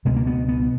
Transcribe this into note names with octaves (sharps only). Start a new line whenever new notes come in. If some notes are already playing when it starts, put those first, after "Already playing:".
C#2 B2 G#3
A#3
B3
B3